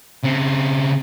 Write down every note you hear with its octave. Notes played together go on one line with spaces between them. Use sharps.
C#3 C4